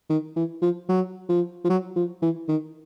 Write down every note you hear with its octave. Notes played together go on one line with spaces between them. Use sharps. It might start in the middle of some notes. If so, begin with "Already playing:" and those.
D#3
E3
F3
F#3
F3
F3
F#3
F3
E3
D#3